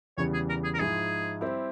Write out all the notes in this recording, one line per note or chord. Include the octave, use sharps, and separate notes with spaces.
E2 C#3 E3 G3 C#5
G#4
A#4
G#4
A#4
G#2 F3 G#3 E4 G#4
G3 C4 E4 G4